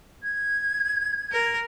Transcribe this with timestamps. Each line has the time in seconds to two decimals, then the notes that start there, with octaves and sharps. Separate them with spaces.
0.23 G#6
1.32 A#4